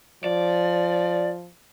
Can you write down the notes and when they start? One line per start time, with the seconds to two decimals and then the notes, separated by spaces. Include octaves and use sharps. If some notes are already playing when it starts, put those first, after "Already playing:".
0.24 F3 D5